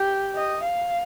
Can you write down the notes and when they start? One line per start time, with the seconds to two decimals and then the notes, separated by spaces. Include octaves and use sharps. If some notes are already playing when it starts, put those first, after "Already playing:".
Already playing: G4
0.35 D#5
0.63 F5